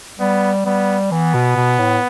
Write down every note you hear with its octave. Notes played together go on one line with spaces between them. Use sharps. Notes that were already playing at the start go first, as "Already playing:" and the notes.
G3 B3
G3 B3
E3 B3
B2
B2
A2